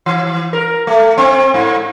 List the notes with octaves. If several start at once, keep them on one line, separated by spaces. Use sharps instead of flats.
E3
A#4
A3
C4
G#2